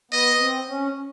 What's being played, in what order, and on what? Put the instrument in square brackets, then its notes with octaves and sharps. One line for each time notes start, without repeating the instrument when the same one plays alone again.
[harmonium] B3 [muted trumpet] D#5
[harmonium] C4
C#4